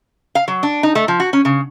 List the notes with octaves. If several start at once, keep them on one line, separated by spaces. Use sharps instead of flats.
F5
F#3
D4
D#4
A3
F3
F#4
C#4
C#3